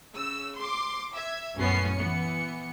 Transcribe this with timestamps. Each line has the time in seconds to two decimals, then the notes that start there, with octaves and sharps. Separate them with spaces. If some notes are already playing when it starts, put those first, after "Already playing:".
0.12 C#3 E6
0.57 C6 D6
1.14 E5 G#6
1.57 A#1 F#2 A2 B3 C#4 C7
1.95 E3 B3 C#7